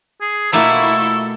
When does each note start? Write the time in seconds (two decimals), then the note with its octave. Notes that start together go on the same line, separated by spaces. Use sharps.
0.21 G#4
0.52 B2 A3 A#3 E4 F4 A4 C#6